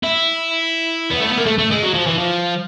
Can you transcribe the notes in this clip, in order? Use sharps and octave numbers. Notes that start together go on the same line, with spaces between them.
E4
B3
A3
B3
A#3
A3
A3
G#3
F#3
F3
E3
F3